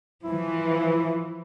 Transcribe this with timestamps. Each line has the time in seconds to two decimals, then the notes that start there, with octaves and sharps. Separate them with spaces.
0.24 E3 F3 E4